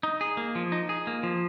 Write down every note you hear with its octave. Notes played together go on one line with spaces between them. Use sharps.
D#4
G#4
A#3
F3
D#4
G#4
A#3
F3